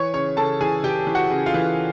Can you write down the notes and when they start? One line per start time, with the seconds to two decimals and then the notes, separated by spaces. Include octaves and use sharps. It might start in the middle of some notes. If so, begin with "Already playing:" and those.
Already playing: E3 C#5 C#6
0.13 C#3 C#5 C#6
0.37 C#3 A4 A5
0.61 E3 G#4 G#5
0.83 E3 G4 G5
1.07 E3
1.15 F#4 F#5
1.31 C#3
1.46 F4 F5
1.54 E3